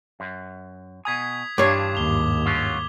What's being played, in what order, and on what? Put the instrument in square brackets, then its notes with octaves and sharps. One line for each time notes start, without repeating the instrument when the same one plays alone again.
[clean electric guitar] F#2
[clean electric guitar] B2 G#5 [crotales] D#6 G#6 B6
[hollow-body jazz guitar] G2 C#5 [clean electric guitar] E3 D4 F4 [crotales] D6
[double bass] D#2 G#2 [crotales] F7 G7
[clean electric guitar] F#3 C#4 F4